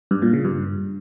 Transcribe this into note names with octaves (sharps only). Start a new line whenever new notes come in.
G2
A#2
C#3
G2